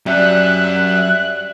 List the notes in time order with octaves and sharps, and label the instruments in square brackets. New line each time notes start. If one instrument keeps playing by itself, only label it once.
[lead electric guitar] F#3 C#4 [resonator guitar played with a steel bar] G3 [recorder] E5 [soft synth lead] F#6